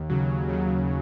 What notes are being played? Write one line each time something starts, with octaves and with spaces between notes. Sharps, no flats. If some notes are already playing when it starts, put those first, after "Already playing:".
Already playing: D#2
C#3 F#3
D#2
C#3 F#3